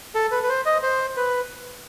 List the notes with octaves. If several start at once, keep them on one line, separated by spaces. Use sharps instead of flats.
A4
B4
B4
C5
D#5
C5
B4